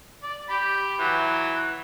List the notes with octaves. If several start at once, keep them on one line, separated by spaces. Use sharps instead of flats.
D5
G4 B5
E3 F#3